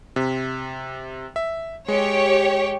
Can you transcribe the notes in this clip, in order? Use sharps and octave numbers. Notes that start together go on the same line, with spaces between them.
C3
E5
G#3 G4 C#5